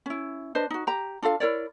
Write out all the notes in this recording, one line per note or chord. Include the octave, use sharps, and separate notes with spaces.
C#4 E4
D4 B4 C5 D#5
D#4 F#4
G4 A#5
D4 F4 A4 F5
E4 A#4 C#5 D5